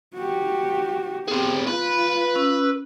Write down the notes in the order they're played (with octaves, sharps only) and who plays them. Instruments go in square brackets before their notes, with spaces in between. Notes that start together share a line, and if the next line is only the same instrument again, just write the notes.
[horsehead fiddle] F#4 G4
[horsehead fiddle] B3 G4 [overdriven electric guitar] C4 G#4
[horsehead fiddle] F4 [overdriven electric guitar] B4 B5
[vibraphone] C#4 E6